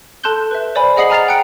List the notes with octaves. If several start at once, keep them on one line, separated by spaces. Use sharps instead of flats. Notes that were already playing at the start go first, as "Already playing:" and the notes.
A4 A5 C6 F#6 G6 G7
B4 E5
C5 D5 G#5 B5
G#4 D#5 F#5 D#6 C7 F#7
G#5 A#5 F6 A6 C7 F7
G5 F#6 C#7 D7